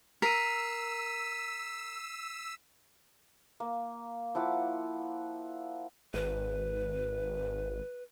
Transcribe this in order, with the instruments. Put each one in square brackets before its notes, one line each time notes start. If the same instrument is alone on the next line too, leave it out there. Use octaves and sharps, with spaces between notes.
[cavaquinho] A#4 [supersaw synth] E6 [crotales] B6 C7 D#7
[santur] A#3
F3 E4 F#5 D6
[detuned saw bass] G#1 [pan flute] B4